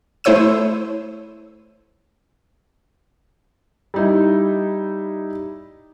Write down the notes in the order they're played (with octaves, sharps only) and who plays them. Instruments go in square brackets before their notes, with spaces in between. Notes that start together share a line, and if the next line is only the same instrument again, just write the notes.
[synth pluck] A3 E4 C5 C#5 E6 D#7
[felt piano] G3 D#4 E4